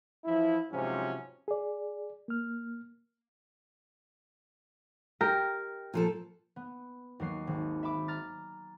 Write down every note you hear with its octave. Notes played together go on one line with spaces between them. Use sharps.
E3 F3 E4
G#2 C3 F3 F#3 C#4
G#4 D5
A#3 F6
D#4 G4 A#4 G5
A#2 F3 A4
B3
D#2 F#3 C7
G#1
E5 B5 D6
A#5 F6 A6